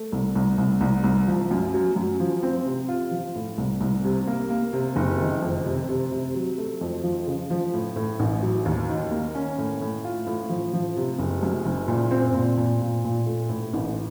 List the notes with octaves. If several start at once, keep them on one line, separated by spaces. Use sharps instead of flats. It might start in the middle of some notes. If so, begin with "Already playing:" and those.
Already playing: A3
C2
C2
C2
C2
C2
F3
F#2
F#3
F#2
F3
C4
C3
F4
F3
A2
C2
C2
C3
A#3
A#3
C3
F#1
D#3
F2
C3
C3
C3
F#3
A3
F2
F3
C#3
F3
A2
A2
A1
F#3
D#2
D#3
A#3
C#4
A2
A2
F4
A2
F3
F3
C3
F#1
F#2
F#1
A#2
C4
A#2
A#2
A#2
A#2
A3
A2
A1